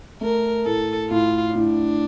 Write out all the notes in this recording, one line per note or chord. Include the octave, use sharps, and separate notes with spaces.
A3 A#4
A2 A4
A2 F4
A2 D4